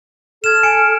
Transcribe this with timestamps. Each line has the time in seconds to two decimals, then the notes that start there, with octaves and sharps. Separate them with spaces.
0.44 A4 F6 G#6 E7
0.63 G#5 C#7 D7